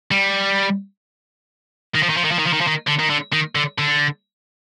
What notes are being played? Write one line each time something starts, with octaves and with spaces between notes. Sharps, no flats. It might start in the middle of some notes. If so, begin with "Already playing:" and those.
G3
D#3
F3
D#3
F3
D#3
F3
D#3
F3
D#3
F3
D#3
D3
D#3
D3
D#3
D3
D3